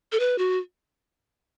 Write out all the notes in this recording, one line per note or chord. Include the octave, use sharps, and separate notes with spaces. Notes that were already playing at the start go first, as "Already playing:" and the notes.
A4
B4
F#4